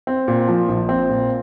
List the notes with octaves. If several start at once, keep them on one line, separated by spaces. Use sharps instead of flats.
C4
A#2
F3
A#1
C4
A#2